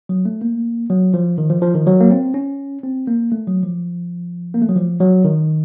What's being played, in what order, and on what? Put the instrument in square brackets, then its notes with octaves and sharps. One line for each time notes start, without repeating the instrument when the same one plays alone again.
[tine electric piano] F#3
A3
A#3
F#3
F3
D#3
F3
F3
D#3
F#3
A#3
C4
C#4
C4
A#3
A3
F#3
F3
A#3
A3
F#3
F3
F#3
D#3